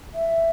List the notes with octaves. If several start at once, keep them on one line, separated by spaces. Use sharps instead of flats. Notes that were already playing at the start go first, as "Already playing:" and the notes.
E5